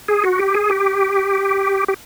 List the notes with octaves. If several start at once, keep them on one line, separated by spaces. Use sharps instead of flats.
G#4
F#4
G4
G#4
G4
G4